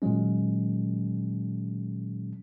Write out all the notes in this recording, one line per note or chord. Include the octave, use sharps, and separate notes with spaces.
A#2 D#3 F#3 G#3 C#4